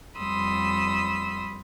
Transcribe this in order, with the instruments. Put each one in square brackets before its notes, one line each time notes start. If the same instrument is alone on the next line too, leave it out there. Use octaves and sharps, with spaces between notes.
[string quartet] F2 G3 B5 C6 D#6 E6